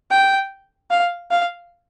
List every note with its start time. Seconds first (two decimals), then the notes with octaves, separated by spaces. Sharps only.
0.11 G5
0.90 F5
1.31 F5